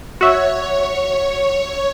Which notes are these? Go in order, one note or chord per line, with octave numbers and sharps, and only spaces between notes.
F#4 C#5 E5